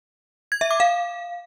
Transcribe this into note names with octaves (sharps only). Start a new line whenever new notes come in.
G#6
E5
D6
F5